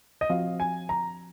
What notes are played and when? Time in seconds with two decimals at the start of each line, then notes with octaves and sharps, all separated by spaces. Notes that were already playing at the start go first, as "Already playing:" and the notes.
0.21 D#5
0.30 F3 C4 F#4 F5
0.60 G#5
0.89 A#5